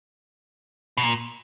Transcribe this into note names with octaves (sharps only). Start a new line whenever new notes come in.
B2
A#2